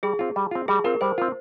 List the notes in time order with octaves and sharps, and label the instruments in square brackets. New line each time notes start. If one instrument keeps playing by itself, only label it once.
[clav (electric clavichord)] G3 [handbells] G#4
[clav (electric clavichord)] C4 F4
G3
C4 F4
[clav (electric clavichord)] G3 [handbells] G#4
[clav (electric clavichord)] C4 F4 [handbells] A#4
[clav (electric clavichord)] G3 [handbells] C5
[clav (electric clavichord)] C4 F4